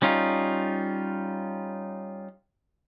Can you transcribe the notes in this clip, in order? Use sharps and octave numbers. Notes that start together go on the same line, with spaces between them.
G3 C#4 D#4 F4